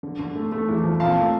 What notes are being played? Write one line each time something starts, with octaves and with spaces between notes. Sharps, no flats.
D3
D3
A3
A3
E2
F3
A#2 F5 A5
A3